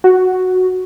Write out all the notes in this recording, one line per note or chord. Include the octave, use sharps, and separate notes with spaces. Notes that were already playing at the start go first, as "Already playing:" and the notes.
F#4